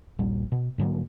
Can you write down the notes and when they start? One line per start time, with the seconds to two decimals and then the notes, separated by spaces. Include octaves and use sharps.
0.19 D#1 A#1 A#2 G3
0.52 B2
0.78 G#2 D3 F#3 A#3